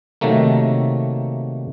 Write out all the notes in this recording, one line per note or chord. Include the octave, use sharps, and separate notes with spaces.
C3 D#3 F#3 A3 A#3